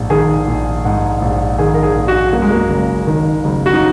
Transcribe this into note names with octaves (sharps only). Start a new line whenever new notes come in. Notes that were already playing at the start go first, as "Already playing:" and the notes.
Already playing: A#1 G#2
D#3 G#4
A#1
G#2
A#1
D#3 G#4
A#4
G#4
A#1
F#4
F#2 A#3
G#3
A#3
F#1
D#3
F#1
F#4
D#4